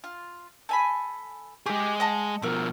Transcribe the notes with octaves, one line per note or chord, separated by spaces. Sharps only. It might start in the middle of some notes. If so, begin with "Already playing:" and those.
F4
A4 G#5 B5
G#3 G4 G#4
D#5 F#5 A5
B2 F3 A4 A#4